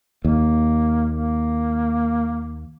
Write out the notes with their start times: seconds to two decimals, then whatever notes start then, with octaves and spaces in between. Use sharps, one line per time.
0.25 D#2 A#3
1.14 A#3